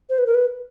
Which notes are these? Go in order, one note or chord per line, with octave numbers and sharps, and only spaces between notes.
C5
B4
A#4
B4